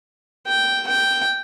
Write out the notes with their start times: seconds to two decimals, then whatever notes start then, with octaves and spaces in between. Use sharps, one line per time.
0.47 G5
0.87 G5